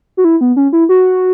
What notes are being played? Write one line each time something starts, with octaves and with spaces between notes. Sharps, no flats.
F#4
E4
B3
C#4
E4
F#4